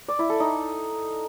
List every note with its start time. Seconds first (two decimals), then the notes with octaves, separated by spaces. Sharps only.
0.08 D5
0.19 E4
0.30 A4
0.40 D#4